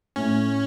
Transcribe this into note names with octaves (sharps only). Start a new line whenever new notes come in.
A2 C#4